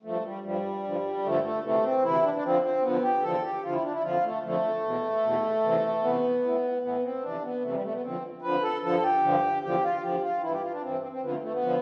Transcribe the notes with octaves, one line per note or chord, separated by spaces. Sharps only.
G2 F3 A3
G3
G2 F3 G3
G2 D3 F3
G2 D3 F3 A3
A3
D2 C3 E3 A3
C4
D2 C3 E3 E4
D4
D4
F2 D3 F3 C4
C4
F2 D3 F3 B3
G4
E2 D3 F3 A4
G4
E2 D3 F3 F4
E4
D4
E4
F2 D3 F3 F4
A3
F2 D3 F3 A3
E2 B2
E2 B2
E2 C3 E3
E2 C3 E3 B3
A2 E3
A2 E3 B3
C4
F2 C3 E3 D4
B3
F2 C3 E3 A3
G3
A3
B3
F2 D3 F3 C4
F2 D3 F3 B4
A4
G2 D3 F3 A4
G4
G2 D3 F3
E2 D3 F3 G4
F4
E2 D3 F3 G4
F4
G2 E3 E4
G4
F4
D4
G2 E3 C4
C4
C4
F2 D3 F3 B3
A3
A3
B3
D3 F3